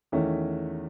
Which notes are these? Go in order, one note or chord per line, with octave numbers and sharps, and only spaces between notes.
E2 D#3 A3 C#4 E4